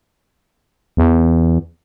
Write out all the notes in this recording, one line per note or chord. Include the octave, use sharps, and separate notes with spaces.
E2